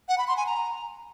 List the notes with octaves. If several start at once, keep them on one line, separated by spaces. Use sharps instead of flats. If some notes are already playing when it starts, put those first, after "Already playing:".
F#5
B5
C6
G#5
A#5